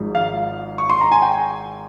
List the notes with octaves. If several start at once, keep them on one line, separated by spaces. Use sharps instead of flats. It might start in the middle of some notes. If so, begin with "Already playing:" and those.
Already playing: G#1 G#2 F3 G#3
F5
C#6
C6
A#5
G#5
G5